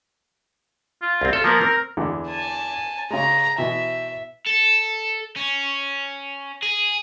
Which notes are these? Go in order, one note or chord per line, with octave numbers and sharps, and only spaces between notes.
F4
C2 C4
F4 A4
F3 A#3 B3 A#4
C4 A#4
E2 D3 G#3
G#5 A5
C#3 G#3 A#5
B2 E3 B3 E5
A4
C#4
G#4